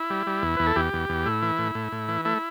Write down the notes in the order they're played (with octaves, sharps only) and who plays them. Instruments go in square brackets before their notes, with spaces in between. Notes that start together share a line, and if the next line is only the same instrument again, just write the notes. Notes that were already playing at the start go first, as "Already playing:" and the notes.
Already playing: [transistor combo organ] E4
G3
G3
E2
E2 B4
A4
E2 G4
E2
E2
A2 E4
E3
A2
A2
A2
E3
A3 E4